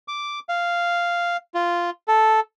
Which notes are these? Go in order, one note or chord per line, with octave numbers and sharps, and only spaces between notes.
D6
F5
F4
A4